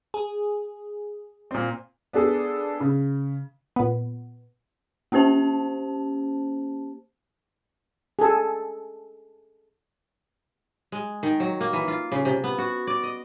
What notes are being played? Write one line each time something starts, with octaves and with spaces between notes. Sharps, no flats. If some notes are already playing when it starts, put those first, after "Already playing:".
G#4
A#2 C4
B3 D4 G#4 A4
C#3
A#2 B3
A#3 C#4 G4 C5 A5
G#4 A4
G#3
D#3
F#3
A#3
E3
F4
C#3
C3
B3
F#4
D5
D#5